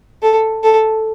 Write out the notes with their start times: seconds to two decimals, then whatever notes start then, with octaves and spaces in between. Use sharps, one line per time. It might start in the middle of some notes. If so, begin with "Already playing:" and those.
0.23 A4
0.64 A4